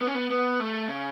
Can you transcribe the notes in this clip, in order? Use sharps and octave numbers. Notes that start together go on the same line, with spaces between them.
B3
C#4
B3
B3
A3
C#3